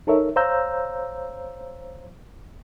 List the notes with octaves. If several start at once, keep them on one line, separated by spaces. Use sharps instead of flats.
D#4 A4 A#4 C#5 E5
C5 C#5 F5 A#5 E6 G6